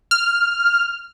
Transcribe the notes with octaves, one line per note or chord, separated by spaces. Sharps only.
F6